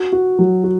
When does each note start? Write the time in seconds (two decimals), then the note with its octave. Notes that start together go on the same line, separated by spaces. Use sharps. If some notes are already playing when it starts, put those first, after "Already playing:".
Already playing: F#4
0.13 F#4
0.39 F#3
0.64 F#4